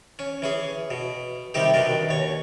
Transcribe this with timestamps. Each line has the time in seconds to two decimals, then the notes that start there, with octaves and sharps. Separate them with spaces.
0.19 C#4
0.42 E3 C#4 G#4
0.91 B2
1.54 C3 D#3 G3 D#4 G4
1.74 B2 D#3 D4 A#4
2.09 D#2 C#5